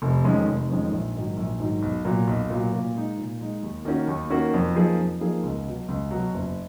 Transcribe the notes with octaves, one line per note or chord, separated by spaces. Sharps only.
F1
F2 D#3 G#3 C#4
F1
F2 D#3 G#3 C#4
A#1
G#2 D#3 F#3
A#1
G#2 D#3 F#3
B1
A#2 F#3
B1
A#2 F#3
A#2
G#3 D#4
A#2
G#3 D#4
D#2
D#3 A#3 C#4 F#4
D#2
D#3 A#3 C#4 F#4
F2
F3 A#3 D#4 G#4
F2
F3 A#3 D#4 G#4
C#2
B2 F#3
C#2
B2 F#3
F#1